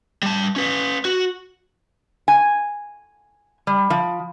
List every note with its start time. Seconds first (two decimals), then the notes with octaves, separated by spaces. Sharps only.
0.23 G3 A5
0.56 C#4 B4
1.05 F#4
2.28 G#5
3.67 G3
3.90 F3